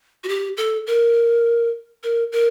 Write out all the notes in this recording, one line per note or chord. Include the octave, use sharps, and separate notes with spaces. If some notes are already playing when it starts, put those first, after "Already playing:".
F#4
G4
A4
A#4
A#4
A#4